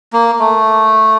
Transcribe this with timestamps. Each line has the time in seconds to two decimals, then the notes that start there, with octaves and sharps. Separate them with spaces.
0.13 A#3
0.39 A3